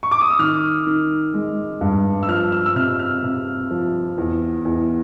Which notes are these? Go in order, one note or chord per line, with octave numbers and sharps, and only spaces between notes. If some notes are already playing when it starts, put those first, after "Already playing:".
C#6
D6
D#6
E6
D#3 F6
D#3
G#3
G2
E6
F3 F6
E6
E6
C3 F6
F6
C3
F3
E2
E2